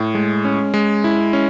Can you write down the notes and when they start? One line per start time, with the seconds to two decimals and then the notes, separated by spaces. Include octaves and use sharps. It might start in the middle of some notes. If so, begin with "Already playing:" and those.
Already playing: A2
0.15 G#3
0.45 C#4
0.74 G#3
1.04 E4
1.33 C#4